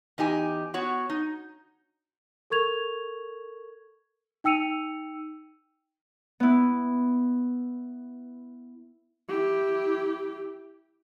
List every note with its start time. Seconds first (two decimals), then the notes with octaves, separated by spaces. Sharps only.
0.18 E2 D#4 G4 G#5
0.74 B3 F#4 C#5
1.10 D#4
2.50 A4 A#4 C#6 G#6 F7
4.44 D#4 G5 E6 C#7 D#7 F7
6.40 B3 E4
9.28 E4 G4